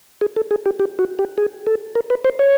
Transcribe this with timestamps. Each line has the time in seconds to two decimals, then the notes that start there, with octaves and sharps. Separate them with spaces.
0.21 G#4
0.36 A4
0.51 G#4
0.66 G4
0.80 G4
0.99 F#4
1.19 G4
1.38 G#4
1.67 A4
1.95 A#4
2.10 B4
2.25 C5
2.39 C#5